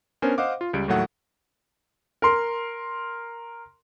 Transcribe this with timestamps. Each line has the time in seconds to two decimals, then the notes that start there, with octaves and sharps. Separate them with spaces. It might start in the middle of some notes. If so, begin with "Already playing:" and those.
0.22 B3 C#4 D4 A#4 C5 G#5
0.38 C5 D#5 F5 F#5 D6
0.61 F4
0.74 C#2 G3 D7
0.88 D#2 A2 F#3 A3 F#5
2.22 A#4 C6